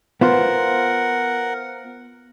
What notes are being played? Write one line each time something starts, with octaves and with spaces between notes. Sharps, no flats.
B3 F4 A#4 C5 F#5